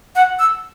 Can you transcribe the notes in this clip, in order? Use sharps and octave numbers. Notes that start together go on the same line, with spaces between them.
F#5
E6